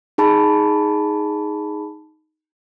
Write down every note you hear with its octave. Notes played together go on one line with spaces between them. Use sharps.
D#4 G#4 A5 B5